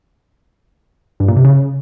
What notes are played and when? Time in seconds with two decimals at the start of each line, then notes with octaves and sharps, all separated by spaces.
1.20 G2
1.28 A#2
1.36 C3
1.45 C#3